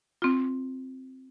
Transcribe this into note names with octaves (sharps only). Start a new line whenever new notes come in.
C4 F4